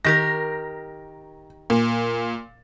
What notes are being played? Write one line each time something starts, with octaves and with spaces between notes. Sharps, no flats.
D#3 G4 A#4 A#6
A#2